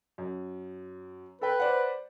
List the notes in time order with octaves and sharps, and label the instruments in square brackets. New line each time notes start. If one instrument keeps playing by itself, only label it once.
[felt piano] F#2
[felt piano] A4 G5 [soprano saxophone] B4
[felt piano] C5 D5 F#5